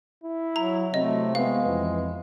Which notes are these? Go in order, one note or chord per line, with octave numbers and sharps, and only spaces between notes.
E4
F#3 A#5
C3 F#3 A3 C4 D#5
G#3 B3 F5
F2 E3